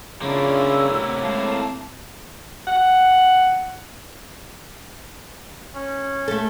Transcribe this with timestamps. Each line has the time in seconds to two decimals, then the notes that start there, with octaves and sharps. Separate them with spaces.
0.22 C#3 A#3 C#4 D4 E4 F4
0.56 E6
0.91 A2 C3
1.23 G#3 C4 F5 A5
2.67 F#5
5.75 C#4
6.28 A3 A4